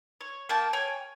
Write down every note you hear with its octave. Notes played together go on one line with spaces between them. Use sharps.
C#5
A#3 G5 A5
C#5 G5 G#5